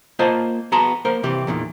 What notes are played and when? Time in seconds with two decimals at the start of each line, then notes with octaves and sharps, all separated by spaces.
0.19 A#3 F4 C5 D#5 A5
0.72 B3 F#4 G#4 A5 A#5 C6
1.05 A#3 A#4 C5
1.23 C3 E3 G4
1.47 E2 A#2 D#3